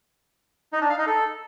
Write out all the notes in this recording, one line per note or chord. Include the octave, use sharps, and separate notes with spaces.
D#4
D4
F5
D#4
A4